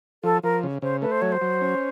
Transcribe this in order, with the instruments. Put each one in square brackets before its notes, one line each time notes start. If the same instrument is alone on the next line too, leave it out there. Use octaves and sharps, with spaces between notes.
[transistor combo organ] F3 [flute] A4
[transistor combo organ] F3 [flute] A#4
[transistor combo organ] C#3
[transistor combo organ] C#3 [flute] C5
[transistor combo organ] A3 [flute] B4
[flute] C5
[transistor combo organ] F#3 [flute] C#5
[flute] C5
[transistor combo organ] F#3
C#4